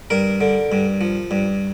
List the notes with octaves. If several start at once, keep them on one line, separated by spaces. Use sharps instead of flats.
G2 A#4
D3
G2
F3
G2